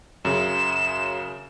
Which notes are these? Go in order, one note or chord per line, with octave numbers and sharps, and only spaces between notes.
F#2 C#3 E7